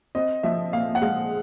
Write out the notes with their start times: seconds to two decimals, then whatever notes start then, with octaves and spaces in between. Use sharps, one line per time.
0.15 C4 D#5
0.43 F3 E5
0.73 A#2 F5
0.95 F#5
1.01 G#3 F5